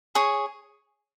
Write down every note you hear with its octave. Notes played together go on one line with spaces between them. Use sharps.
G#4 C#5